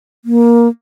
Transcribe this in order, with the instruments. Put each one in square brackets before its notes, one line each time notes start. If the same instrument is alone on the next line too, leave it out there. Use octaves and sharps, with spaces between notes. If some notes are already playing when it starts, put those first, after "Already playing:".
[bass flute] A#3